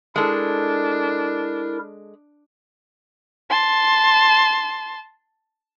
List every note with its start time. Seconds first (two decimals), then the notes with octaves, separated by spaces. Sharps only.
0.16 G#3 D4 E4 A4 A#4
3.50 A5 C6